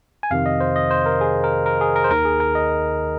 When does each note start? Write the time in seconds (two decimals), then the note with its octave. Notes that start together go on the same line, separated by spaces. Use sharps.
0.23 G#5
0.31 F2 C3 D#3 F5
0.46 D#5
0.60 C5
0.76 D#5
0.91 C5
1.06 A#4
1.21 G#4
1.44 A#4
1.66 A#4
1.81 G#4
1.96 A#4
2.04 C5
2.10 D#2 D#3 A#4
2.25 G#4
2.40 A#4
2.55 D#5